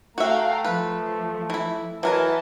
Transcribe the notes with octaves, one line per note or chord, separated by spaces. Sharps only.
A3 F#4 E5 F5 G5 A#5
F3 B4
E3 E4
E3 F#3 A#4 D#5 E5 G#5 A5